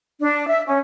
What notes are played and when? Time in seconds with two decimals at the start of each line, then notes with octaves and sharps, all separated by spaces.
0.21 D4
0.47 E5
0.67 C#4